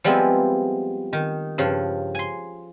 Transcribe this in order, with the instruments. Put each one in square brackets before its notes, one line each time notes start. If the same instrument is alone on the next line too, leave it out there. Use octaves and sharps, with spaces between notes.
[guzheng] F3 G3 G#3 B3 C4 E4
D#3
G2 C#3 F3
G#5 C6